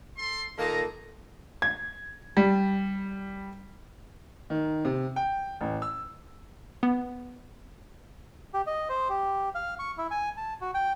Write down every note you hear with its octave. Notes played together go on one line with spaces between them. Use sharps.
A4 C6
A#2 D#3 A#3 A4 D#5 A#5
G#6
G3
D#3
C3
G5
A1
E6
B3
G4
D#5
C5
G4
F5
C#6
E4
G#5
A5
F#4
G5